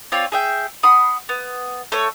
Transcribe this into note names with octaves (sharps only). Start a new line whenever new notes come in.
C4 F4 C#5 D5
G#4 E5 G5
F#5 B5 C6 D#6
B3
A3 C#5